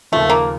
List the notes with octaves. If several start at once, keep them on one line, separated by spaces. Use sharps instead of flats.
D#2 C#3 F3 A3
A#3